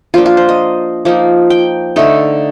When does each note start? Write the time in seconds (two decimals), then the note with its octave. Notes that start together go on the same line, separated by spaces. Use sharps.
0.14 F3 A#3 D4 F4
0.26 F4
0.37 C5
0.49 D#5
1.05 F3 A#3 D#4
1.50 G5
1.96 D3 A3 D#4